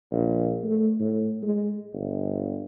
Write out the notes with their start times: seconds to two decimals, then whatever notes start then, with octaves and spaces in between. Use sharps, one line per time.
0.11 A#1
0.64 A3
1.00 A2
1.43 G#3
1.94 G1